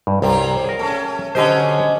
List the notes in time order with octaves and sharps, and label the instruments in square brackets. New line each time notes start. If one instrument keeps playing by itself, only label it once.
[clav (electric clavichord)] G2
[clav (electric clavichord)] C2 [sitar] C3 F#3 G4
[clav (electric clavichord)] G#4 A#4
[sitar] A3 C#4
[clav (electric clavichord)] D3 G4 C5 [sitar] F#3 C#4 D#5